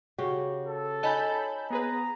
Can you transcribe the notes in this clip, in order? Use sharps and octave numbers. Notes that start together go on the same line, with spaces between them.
C#3 F#4 G4
A4
D#4 C#5 D#5 G#5 A5 B5 G6
B3 G#4 B4 A#5